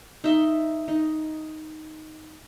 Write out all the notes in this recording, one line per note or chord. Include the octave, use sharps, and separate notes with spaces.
D#4 E5 C6
D#4